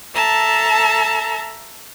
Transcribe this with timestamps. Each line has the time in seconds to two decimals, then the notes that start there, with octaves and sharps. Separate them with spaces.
0.14 A4 E5 A5 A#5